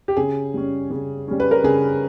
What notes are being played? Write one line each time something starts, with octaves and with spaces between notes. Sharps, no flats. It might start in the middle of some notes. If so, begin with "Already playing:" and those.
G4
C#3 G#4
G3 C#4
C#3
G3 C#4
B4
A#4
C#3 G#4